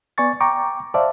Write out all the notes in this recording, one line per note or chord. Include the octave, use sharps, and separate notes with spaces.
B3 D5 G#5 C#6 A6
G5 A#5 C#6 D6
C5 D5 E5 F5 A5